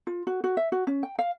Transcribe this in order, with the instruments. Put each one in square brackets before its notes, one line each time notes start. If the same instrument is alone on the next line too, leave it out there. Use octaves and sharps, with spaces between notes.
[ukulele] F4
F#4
F#4
E5
F#4
C#4
G5
F5